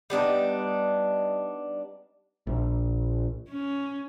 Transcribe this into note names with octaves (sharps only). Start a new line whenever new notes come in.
G3 B3 D4 D#4
A#1
C#4